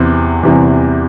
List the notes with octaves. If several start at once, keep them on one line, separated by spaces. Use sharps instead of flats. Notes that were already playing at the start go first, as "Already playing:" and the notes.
Already playing: E2 C3 E3 C4
E2 C3 E3